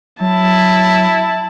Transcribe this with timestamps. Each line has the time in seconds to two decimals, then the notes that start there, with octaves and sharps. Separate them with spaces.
0.21 F#3 E4 A5